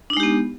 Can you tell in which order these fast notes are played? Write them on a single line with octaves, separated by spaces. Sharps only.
D4 D#4 G#3 G4 B3